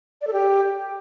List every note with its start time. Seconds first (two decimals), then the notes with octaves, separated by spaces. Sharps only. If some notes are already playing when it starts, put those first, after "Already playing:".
0.21 D5
0.27 A4
0.33 G4